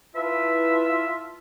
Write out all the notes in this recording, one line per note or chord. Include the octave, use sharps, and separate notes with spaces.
E4 F4 B4 E5 A5